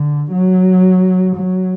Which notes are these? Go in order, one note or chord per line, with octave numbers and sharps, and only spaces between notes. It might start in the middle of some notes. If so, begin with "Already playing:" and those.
Already playing: D3
F#3
F#3